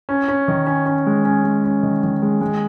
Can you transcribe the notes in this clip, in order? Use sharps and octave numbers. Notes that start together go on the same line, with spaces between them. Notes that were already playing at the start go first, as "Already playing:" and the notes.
C#4
C#4
D#3
C#4
C#4
G#3
C#4
G#3
C#4
D#3
D#3
G#3
G#3